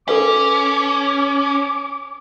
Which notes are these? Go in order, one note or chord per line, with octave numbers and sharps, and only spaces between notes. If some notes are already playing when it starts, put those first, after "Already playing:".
C#4 A4 B4 F5 D6